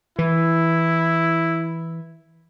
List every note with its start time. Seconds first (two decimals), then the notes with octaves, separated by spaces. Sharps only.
0.19 E3 E4